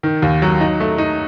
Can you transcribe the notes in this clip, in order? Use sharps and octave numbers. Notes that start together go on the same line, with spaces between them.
D#3
D#2
F#3
D#4
A3
D#4